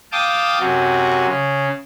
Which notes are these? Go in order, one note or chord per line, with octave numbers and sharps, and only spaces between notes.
F5 G5 A5 D6 D#6
F#2 C3 F#4
C#3